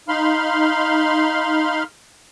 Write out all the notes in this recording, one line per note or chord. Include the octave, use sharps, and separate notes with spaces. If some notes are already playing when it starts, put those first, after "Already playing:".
D#4 F5 B5 C6 F6